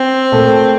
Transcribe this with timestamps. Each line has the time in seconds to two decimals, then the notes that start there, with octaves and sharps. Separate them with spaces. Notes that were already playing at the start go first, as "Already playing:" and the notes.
Already playing: C4
0.32 A#2 A3